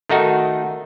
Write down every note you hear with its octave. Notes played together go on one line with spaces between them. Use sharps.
D#3 A3 D#4 F#4